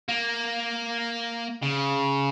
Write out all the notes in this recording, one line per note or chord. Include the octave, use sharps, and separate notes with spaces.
A#3
C#3